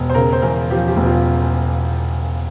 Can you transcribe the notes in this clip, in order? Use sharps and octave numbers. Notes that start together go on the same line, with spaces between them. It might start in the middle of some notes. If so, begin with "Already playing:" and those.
Already playing: E1
C5
C#3 A#4
C5
E2 A#4
F3 G4
G4
E1
F4